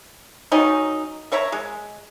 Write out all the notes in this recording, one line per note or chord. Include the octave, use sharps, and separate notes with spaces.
D#3 F#3 C#4 D#4
A#4 C#5 E5 A#5
G#3